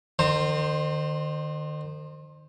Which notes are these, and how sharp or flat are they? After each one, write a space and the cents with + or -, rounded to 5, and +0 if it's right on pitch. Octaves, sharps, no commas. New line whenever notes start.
D#3 -40 C5 +0 A#5 -30